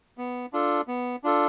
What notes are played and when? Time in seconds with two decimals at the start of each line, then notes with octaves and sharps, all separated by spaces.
0.18 B3
0.53 D4 F4 A4
0.88 B3
1.24 D4 F4 A4